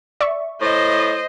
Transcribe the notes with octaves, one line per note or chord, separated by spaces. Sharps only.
D5 E5 C#6
A2 C5 D#5